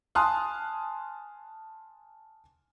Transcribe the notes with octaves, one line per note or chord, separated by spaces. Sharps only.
G#5 A5 C6 D#6 F6 F#6